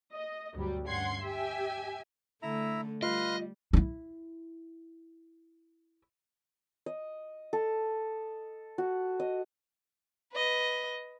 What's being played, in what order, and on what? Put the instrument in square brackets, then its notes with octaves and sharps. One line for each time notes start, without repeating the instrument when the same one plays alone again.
[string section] D#5
D2 G2 F#3 G3
G2 C#4 F#5 C6 G#6 C7
G4 E5 G5 G#5
[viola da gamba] D3 A3 [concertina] E4 E5 A#5
[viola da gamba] G3 [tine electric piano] F4 [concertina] B4 F5 C6 [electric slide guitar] D#5
[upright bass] D#4 E4
[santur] D#5
A4
F#4
D#5
[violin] B4 D#5